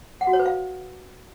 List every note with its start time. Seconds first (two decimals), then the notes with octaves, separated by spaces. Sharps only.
0.21 F#5
0.27 F#4
0.33 C#5
0.40 B4
0.46 F5